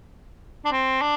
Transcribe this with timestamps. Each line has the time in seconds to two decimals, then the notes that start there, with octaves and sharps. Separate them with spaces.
0.65 D4
0.72 C4
1.01 D4